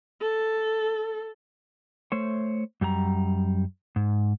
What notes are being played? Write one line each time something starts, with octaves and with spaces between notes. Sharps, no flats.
A4
A3 C5 C#5
F#2 G3 F#4 A#5
G#2